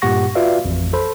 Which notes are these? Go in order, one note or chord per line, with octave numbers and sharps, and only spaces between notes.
G2 A#2 G4 F#5 C#6 A#6
F4 F#4 B4 D5 E5 F5
A1 F2
A4 C5 B5